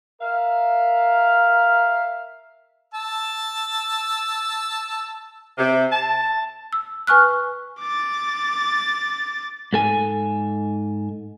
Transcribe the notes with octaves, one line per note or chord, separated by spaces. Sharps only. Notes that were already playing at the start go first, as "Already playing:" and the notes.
A#4 E5 F5
A5 E6
C3
A5
E6
B4 G#5 C#6 F6 F#6
D6 A6
G#2 A4 G#5